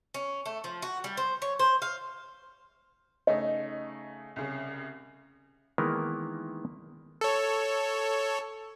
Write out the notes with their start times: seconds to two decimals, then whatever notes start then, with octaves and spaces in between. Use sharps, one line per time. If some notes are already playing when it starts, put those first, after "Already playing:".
0.14 C#4
0.46 A3
0.64 F3
0.82 F#4
1.04 G3
1.17 C5
1.42 C#5
1.59 C5
1.82 F5
3.27 C#3 A3 D#4 D#5
4.36 C2 C#3
5.78 D#3 E3 G#3 A#3 B3 A#4
7.21 A4 C#5